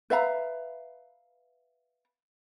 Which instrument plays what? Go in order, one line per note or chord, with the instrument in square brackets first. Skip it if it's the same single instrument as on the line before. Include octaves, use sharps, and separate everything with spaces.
[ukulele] B4 E5 F5 A#5